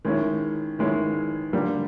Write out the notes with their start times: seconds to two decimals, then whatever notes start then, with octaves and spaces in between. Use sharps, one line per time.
0.05 D#3 G#3 C#4 E4
0.79 D#3 G#3 C#4 E4
1.53 D3 G3 A#3